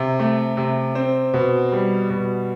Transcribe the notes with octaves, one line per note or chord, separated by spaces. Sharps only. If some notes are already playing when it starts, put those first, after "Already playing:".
Already playing: C3
A3
C3
C4
B2
G3
B2